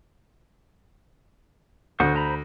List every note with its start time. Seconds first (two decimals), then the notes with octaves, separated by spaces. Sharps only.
2.00 D2 C5 F#5 C#6
2.15 C5 A#5 B5